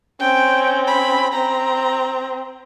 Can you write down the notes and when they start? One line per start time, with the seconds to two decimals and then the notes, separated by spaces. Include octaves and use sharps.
0.21 C4 C#4 G5
0.88 B5
1.34 C4 A#5